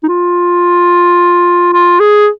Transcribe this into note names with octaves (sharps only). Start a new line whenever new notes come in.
D#4
F4
F4
G#4